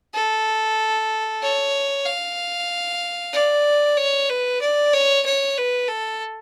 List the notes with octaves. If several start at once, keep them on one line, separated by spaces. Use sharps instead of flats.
A4
C#5
F5
D5
C#5
B4
D5
C#5
C#5
B4
A4